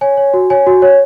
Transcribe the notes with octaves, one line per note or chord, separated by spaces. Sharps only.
C#5 G#5
C#5
F#4
C#5 G#5
F#4
C#5